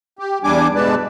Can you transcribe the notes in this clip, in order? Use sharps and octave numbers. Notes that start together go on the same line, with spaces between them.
G4
E2 G3 D4 G#5 D6
G2 B2 G#3 B4 D5 A5